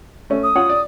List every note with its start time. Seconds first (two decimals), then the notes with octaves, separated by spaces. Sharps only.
0.30 A3 C#4
0.43 D#6
0.56 F4 C#5 F#5
0.70 D5